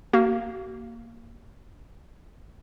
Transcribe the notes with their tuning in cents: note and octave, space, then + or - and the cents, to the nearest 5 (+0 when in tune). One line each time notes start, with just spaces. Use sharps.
A#3 -5 F#4 +40